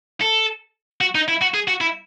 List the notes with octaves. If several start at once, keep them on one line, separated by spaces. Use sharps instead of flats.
A4
F#4
D#4
E4
F#4
G#4
F#4
E4